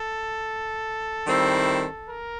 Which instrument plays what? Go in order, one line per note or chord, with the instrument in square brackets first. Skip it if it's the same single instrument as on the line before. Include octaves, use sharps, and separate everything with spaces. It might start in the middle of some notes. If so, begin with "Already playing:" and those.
Already playing: [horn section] A4
D#3 G3 C4 E4
A#4